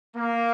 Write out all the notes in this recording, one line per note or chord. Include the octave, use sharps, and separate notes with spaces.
A#3